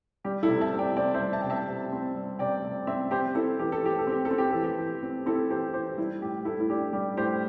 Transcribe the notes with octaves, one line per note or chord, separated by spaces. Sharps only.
G3 G4
E4 A4
C3
E5 A5
C3
D5 G5
C4 D5 G5
C5 E5
G3
E5 A5
C3 G5
E5 A5
C3
C4
G3
C3 D5 G5
C3
C4 C5 E5
C4 G4 C5
C4 E4 A4
E3 G4
A4
E3 G4
A4
C4
G4
A4
C4
G4
E3 A4
G4
E3
C4
C4 E4 A4
E3 G4 C5
E3 G4 C5
G3 E4
A2 G4
A2 E4 A4
E4
D4 G4
G3 G4
A2 G4 C5